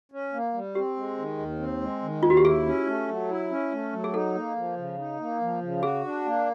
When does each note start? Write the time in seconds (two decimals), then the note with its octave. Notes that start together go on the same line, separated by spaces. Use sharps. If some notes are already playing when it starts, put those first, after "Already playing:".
0.12 C#4
0.33 A#3
0.54 G3
0.75 C4 G4
0.96 G#3
1.18 D#3
1.38 D#2
1.59 C4
1.81 G#3
2.02 D#3
2.23 D#2 F4
2.30 F#4
2.37 G4
2.44 E4 G#4
2.66 C#4
2.87 A3
3.08 F#3
3.29 E4
3.51 C#4
3.72 A3
3.93 F#3
4.04 G#4
4.13 D#4 A4
4.35 A#3
4.56 F3
4.77 C#3
4.98 D#4
5.20 A#3
5.41 F3
5.62 C#3
5.83 F#4 G#4
6.04 D4
6.25 A#3